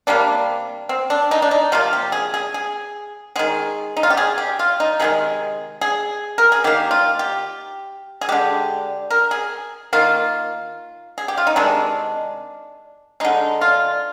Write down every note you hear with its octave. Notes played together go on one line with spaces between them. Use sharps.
C3 G3 A#3 D4
C4
D4
D#4
D4
D#4
C3 F3 A#3 F4
G4
G#4
G#4
G#4
D#3 G#3 G#4
D#4
F4
G4
G#4
G4
F4
D#4
C3 D#3 G#3 G#4
G#4
A#4
G#4
D#3 A#3 G4
F4
G4
G#4
D3 G#3 G4
A#4
G#4
D#3 A#3 F4
G#4
G4
F4
D#4
C3 D#3 G#3 D4
D3 G#3 D#4
F4